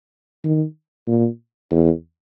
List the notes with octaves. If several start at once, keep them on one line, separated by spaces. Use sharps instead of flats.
D#3
A#2
E2